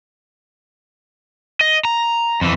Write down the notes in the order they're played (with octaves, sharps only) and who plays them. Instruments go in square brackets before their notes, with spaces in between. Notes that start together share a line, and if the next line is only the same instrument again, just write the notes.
[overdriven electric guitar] D#5
A#5
F2 E3